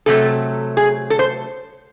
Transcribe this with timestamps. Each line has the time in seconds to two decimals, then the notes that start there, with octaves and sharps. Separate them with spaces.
0.06 C3 F#3 A3 A4
0.77 G#4
1.10 A4
1.19 C5